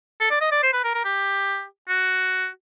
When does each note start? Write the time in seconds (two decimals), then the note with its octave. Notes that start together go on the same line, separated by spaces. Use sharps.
0.20 A4
0.31 D5
0.41 D#5
0.52 D5
0.63 C5
0.73 B4
0.84 A#4
0.94 A#4
1.05 G4
1.89 F#4